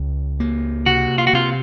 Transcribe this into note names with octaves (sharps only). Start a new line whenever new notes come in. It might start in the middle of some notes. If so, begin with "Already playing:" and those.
Already playing: C#2
A#3
C3 F#4
F4
F#4
C3 F4